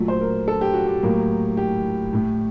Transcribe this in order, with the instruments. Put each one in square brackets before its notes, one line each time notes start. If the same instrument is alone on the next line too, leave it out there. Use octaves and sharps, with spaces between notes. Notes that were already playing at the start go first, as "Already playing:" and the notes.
Already playing: [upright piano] A#2 F#3 A3
C5
A#4
A4
G4
F#4
G4
A2 F#3 A#3
G4
A2 A3